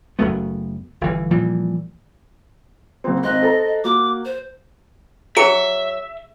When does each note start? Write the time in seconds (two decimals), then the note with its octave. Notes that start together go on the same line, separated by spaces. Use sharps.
0.19 F#1 F#2 A3 B3
1.01 G1 E3
1.31 A#2 E3 F3 G3
3.04 F#1 C4
3.23 G#1 C4 D#5 F#6
3.43 A4 C5 A#5
3.84 A#3 F#4 D6
4.25 C5
5.37 F#3 G#4 E5 C#6 C#7